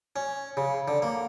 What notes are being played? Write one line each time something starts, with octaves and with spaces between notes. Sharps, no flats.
C#4
C#3
D3
A#3